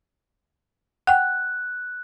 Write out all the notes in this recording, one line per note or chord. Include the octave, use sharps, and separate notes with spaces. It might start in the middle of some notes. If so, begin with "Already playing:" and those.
F#5 G5 F#6